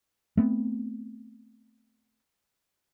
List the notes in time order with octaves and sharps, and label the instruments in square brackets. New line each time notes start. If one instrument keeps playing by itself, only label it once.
[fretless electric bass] A3 B3 C4